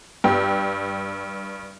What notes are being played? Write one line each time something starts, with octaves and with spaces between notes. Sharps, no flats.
G2 G5